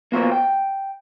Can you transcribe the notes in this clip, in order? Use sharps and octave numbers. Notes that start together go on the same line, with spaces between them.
A#3 B3 F4 F#4 A#4 C5
G5